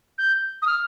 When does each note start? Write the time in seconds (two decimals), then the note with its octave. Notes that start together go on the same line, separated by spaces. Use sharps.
0.18 G6
0.62 D#6
0.67 F6